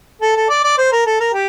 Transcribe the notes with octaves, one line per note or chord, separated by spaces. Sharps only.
A4
A4
D5
D5
C5
A#4
A4
A#4
G4